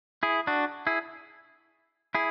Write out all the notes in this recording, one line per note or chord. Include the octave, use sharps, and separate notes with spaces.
E4 G#4
D4 F#4
E4 G#4
E4 G#4